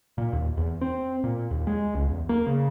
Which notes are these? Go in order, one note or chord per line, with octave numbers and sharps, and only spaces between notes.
A#2
D#2
E2
C4
A#2
D#2
G#3
C#2
E2
A#3
C#3